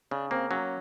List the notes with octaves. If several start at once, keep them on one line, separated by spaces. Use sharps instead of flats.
C#3 D4
A#3 C4
F#3 C#4